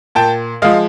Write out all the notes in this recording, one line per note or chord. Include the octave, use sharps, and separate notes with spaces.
A#2 G5 A5
F3 G#3 D#5 F5